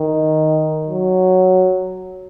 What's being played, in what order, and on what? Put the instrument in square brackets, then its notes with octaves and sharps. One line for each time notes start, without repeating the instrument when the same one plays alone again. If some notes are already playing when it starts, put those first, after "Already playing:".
Already playing: [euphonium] D#3
F#3